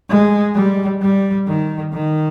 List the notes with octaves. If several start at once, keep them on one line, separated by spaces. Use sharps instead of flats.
G#3
G3
G3
D#3
D#3